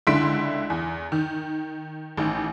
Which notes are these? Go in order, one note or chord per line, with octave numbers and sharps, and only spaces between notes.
C#2 D3 E4 C6 B6 D7
E2
D#3
A1 D#3